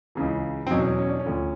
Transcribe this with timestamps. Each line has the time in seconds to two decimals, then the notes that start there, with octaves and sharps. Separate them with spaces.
0.15 C#2 C#3 E3
0.67 C4
0.70 E2 B2 F#3 C#4
0.98 C#4
1.09 D4
1.20 C#4
1.26 D2 D3 F3